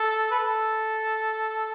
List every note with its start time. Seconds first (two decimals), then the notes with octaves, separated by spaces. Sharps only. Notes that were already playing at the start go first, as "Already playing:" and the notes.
Already playing: A4
0.31 B4
0.39 A4